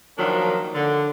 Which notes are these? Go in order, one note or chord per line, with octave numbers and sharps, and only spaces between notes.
D#3 F3 F#3 A#3 D4
D3